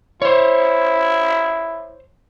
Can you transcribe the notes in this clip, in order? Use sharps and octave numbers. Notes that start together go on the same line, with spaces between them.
E4 C5 C#5